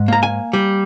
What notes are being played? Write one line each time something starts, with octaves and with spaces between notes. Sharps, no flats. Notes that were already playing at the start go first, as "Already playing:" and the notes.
Already playing: G#2
A#3 A#5
G#5
G3